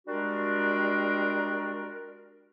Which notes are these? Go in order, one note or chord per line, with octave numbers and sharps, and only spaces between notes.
G3 G#3 D4 F#4 A#4